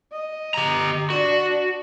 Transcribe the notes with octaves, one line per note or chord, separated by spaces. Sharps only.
D#5
G4 A#5
D4 F#4